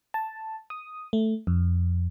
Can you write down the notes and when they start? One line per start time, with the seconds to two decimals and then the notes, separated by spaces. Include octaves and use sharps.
0.14 A5
0.70 D#6
1.13 A3
1.47 F2